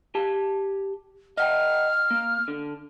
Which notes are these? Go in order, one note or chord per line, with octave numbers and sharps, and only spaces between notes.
G4 A5
D#5 F#5 G5 F6
A#3
D3